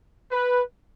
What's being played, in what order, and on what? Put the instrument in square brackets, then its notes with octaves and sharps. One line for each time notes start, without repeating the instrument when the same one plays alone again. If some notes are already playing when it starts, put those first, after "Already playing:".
[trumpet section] B4